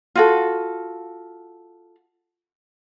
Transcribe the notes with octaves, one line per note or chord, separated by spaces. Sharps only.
F4 F#4 A4